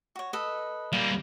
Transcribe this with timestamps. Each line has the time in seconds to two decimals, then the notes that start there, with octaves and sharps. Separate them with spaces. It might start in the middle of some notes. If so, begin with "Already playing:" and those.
0.16 F#4 C#5
0.33 A4 B4 D#5
0.93 G3 A#3 F5 B5